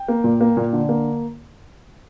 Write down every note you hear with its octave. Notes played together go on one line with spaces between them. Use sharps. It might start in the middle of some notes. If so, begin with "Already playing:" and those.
Already playing: G5
A#3
A#2
A#3
A#2
D3
A#3